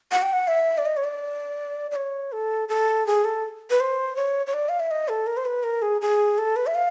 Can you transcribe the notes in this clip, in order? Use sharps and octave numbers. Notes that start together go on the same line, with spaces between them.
F#5
G5
F#5
E5
D5
D#5
C#5
D5
D5
C#5
A4
A4
G#4
A4
B4
C5
C#5
C#5
D5
F5
E5
D#5
A4
A#4
C5
B4
A#4
G#4
G#4
A4
B4
E5
F5